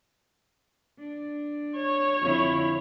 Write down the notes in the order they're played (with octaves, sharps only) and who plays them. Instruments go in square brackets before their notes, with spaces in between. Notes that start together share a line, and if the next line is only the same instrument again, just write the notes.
[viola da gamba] D4
[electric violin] C#5
[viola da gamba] F2 D3 E4